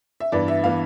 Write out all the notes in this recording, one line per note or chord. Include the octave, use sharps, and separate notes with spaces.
E5
G2 E3 B3 D5
E5
E3 B3 F5